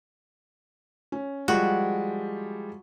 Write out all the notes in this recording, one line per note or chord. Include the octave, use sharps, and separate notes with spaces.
C#4
F3 G3 G#3 F#4